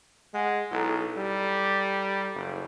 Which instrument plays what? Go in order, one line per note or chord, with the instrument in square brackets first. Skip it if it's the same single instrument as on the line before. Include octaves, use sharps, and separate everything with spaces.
[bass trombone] G#3 [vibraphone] F#5 G#5
[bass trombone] B1 [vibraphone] E4 A4 A#5
[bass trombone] G3
F#1